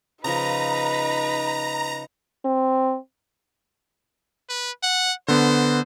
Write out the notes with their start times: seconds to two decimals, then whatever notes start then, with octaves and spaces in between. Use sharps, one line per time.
0.24 C#3 F3 D#4 B4 A#5
2.45 C4
4.49 B4
4.83 F#5
5.28 D3 B3 C5